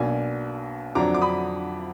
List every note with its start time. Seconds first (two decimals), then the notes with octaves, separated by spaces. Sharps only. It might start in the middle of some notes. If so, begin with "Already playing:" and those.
Already playing: B1 B2 A#3 D4 G#5
0.95 F2 D3 F#3 D4 A#5 D6
1.14 D6
1.22 B5 D#6